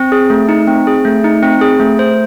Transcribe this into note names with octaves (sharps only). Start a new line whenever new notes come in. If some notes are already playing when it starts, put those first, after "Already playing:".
Already playing: C4
G#4
A3
D#4
C4
G#4
A3
D#4
C4
G#4
A3
C5